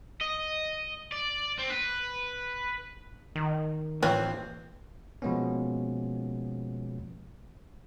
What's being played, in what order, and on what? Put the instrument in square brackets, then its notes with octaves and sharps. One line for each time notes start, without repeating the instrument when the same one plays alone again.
[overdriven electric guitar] D#5
D5
C4
B4
[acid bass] D#3
[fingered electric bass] A2 E3 A#3 [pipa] C4 [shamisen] F4 B4 C#5
[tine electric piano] B2 F3 G#3 A#3 B3 C#4